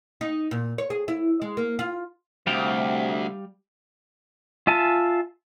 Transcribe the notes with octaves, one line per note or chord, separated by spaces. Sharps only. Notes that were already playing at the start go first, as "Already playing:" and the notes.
D#4
A#2
C#5
G#4
E4
G#3
A#3
F4
D2 C3 G3 F5 G5
F4 E5 G#5 A5